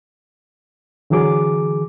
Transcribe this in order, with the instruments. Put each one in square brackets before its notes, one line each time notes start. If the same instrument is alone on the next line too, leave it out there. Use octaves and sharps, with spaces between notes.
[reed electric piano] D3 E3 F#3 G#4 D6